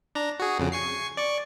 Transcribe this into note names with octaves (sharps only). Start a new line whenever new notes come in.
D4 A#5
F#4 G#4
F2 C#3
G#5 C#6 C7
D5 C#6